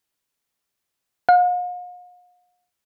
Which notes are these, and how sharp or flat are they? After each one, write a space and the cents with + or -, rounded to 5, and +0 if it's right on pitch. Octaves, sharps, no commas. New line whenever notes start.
F5 +45